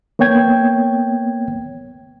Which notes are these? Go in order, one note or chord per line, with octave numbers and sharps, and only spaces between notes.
A#3 B3 C#5 G5 G#6